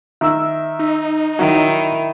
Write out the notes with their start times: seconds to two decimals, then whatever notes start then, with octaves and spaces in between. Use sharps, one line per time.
0.21 D#3 E5 E6
0.79 D#4
1.39 D#3 F#3 E4